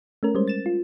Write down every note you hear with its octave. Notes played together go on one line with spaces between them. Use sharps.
A3 C#4 A#4
G3 G#3 C#4 C5
A6 E7
F4